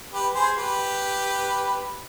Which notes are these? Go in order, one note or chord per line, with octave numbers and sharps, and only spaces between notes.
G4 B4
G#4 C5
G4 B4